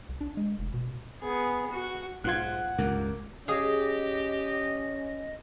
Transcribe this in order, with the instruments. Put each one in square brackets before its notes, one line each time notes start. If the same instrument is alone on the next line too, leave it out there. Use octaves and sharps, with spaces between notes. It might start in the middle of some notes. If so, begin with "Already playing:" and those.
[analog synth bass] C2
D4
G#3
F1
B2
[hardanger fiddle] B3 G#4
F#4
[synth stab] B1 F4 [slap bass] G#2 [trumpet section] F#5 [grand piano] F#6 G#6
[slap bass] C#2 G2 [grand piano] A#3
[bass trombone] C#4 [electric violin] G4 [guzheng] G#4 F5 [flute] D#5